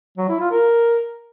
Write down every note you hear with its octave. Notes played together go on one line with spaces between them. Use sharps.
F#3
E4
F4
A#4